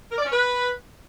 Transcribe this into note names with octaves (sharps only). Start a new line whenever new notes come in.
A#4
D5
C#4
B4